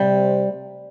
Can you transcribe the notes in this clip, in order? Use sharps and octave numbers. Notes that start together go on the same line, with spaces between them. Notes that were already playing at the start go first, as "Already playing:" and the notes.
Already playing: C3 G3